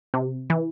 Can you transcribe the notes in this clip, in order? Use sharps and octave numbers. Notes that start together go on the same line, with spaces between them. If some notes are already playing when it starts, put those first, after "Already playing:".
C3
E3